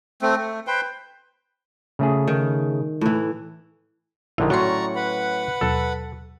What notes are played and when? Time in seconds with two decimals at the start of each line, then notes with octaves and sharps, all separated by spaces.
0.22 A3 C4
0.37 A3
0.67 B4 C5 G5
1.99 C#3 A3 G#4
2.28 D#3
3.01 A2 E3
4.38 A#1 D3 D#3 E4
4.50 A2 F#3 C#4 F#4 D5 A#5 C6 C#6
4.96 B4 F#5 B5
5.61 D#2 B2 F#3 A4